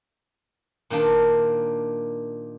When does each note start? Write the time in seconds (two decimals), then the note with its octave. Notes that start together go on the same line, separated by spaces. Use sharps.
0.90 A#2 D#3 A#3 D4